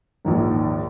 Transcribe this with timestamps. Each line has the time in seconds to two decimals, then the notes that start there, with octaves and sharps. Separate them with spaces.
0.25 A#1 D#2 G#2